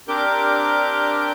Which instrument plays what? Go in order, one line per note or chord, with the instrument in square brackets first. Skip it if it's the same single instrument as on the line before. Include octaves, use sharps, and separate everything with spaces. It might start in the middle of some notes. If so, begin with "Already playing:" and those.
[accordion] C4 D4 G4 A#4 D6 G6